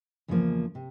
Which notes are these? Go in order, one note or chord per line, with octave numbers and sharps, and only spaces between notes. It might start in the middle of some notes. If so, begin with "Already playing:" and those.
E2 C#3 F3 A#3
C3